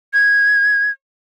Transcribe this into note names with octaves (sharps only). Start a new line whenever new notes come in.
G#6